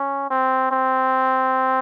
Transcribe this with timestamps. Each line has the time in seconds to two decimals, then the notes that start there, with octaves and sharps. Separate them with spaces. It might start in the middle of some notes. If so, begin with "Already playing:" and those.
Already playing: C#4
0.30 C4
0.71 C4